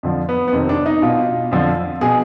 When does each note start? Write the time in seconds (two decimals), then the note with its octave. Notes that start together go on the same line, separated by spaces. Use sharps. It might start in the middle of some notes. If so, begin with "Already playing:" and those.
0.03 F2 D3 F3
0.29 B3
0.48 B3
0.52 F2 C3 D#3 C4
0.69 D4
0.86 D#4
1.02 B2 F4
1.51 F2 D3 F3
2.01 B2 G#4